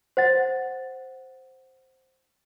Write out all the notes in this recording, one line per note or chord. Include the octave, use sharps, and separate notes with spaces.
C5 F#5 A6